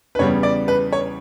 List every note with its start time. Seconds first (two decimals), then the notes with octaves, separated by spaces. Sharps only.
0.15 B4
0.19 E2 C#3 G3 B3 C#5
0.43 D5
0.68 B4
0.92 C#5